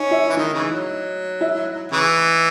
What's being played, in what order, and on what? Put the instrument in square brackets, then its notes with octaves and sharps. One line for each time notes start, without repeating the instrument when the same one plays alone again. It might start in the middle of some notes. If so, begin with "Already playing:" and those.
Already playing: [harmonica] C#4 [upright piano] D#4
[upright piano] E4
[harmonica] E3
[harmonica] D#3 [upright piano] D#4
[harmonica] C#3 E3
F#3
[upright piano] E4
[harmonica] C#3 E3